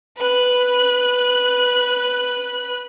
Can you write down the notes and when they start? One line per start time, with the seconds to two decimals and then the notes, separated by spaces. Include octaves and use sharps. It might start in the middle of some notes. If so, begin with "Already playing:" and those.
0.17 B4 F#6